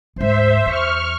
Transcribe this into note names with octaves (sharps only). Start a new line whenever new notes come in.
D2 G#2 C5 E5
E2 C#6 F6